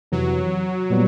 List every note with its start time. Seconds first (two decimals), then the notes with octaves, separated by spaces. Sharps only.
0.12 F2 C3 E3 F#3
0.90 A#2 G3 B3